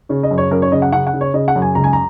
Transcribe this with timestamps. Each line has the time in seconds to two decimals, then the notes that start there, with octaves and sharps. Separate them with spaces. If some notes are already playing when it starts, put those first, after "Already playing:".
0.09 C#3 C#5
0.23 D#5
0.31 F#2
0.38 C#5
0.51 F#2 A#4
0.62 C#5
0.72 C#3 D#5
0.82 F#5
0.92 C#3 F#5
1.07 F#5
1.13 C#3
1.21 C#5
1.34 C#3 D#5
1.48 F#5
1.56 F#2
1.62 G#5
1.75 C#2 A#5
1.84 G#5
1.93 A#5